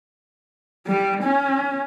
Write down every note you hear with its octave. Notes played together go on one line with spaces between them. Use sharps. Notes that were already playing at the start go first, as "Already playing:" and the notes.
G3
C#4